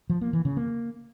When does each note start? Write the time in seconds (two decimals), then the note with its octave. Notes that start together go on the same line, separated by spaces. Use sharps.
0.10 F3
0.21 A#3
0.33 E3
0.45 C#3
0.57 A#3